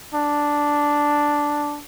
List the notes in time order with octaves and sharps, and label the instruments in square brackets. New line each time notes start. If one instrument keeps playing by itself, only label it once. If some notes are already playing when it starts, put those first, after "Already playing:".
[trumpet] D4